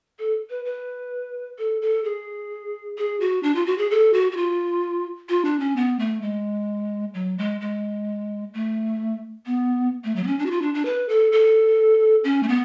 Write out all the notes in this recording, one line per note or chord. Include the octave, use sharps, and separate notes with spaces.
A4
B4
B4
A4
A4
G#4
G#4
F#4
D4
F4
F#4
G#4
A4
F#4
F#4
F4
F4
D4
C#4
B3
A3
G#3
F#3
G#3
G#3
A3
B3
A3
F#3
B3
C#4
D4
F#4
F4
D4
D4
B4
A4
A4
C#4
A3
B3